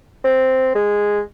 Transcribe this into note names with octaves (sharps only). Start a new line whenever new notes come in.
C4
G#3